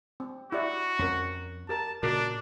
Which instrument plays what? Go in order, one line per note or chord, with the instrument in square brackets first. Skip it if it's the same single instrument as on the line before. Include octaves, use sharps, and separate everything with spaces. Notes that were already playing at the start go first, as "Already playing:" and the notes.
[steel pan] C4
[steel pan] E4 G4 D5 [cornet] F#4
[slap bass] F2 F3 [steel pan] C#4 A#4
[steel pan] G4 A#4 A#5 [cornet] A5
[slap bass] A#2 C#3 [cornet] D4 [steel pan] F#4 A#4